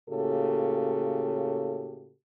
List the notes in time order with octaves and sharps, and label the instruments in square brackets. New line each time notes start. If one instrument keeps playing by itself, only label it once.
[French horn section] A2 C#3 A#3 F#4 G4 A4